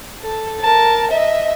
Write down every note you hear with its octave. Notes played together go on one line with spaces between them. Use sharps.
A4
A#4 A5
D#5 E5